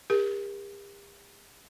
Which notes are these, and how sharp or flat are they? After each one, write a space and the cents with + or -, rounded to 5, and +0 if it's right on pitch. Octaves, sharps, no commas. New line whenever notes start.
G4 +45 A#4 +25